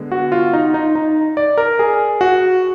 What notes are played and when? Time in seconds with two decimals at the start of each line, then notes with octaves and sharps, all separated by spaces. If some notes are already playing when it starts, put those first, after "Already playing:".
Already playing: D3 G#3 B3
0.12 F#4
0.32 F4
0.53 D#4
0.74 D#4
0.95 D#4
1.37 D5
1.58 A#4
1.79 G#4
2.21 F#4